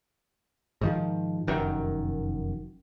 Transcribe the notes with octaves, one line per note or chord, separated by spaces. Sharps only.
G#2 D#3 F3
F1 F#2 D#3